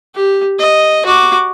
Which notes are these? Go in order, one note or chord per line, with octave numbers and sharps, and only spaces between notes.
G4
D#5
F#4 D6